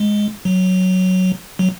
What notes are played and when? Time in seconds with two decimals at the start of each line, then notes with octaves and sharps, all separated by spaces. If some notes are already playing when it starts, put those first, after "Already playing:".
Already playing: G#3
0.45 F#3
1.59 F#3